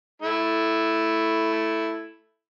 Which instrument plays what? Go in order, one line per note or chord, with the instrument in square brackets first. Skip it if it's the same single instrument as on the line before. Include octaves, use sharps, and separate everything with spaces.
[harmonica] A3 E4